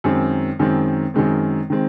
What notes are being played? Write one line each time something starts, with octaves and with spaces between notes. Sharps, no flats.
F#2 D#3 G#3 C4
F#2 D#3 G#3 C4
F#2 D#3 G#3 C4
D#3 G#3 C4